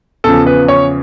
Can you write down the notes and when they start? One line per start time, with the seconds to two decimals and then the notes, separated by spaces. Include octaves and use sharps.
0.24 E2 C#3 F3 A4
0.46 B4
0.68 C#5